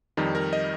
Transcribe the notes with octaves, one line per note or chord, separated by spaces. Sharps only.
F2 D#3 G3 D#4
A#4
D#5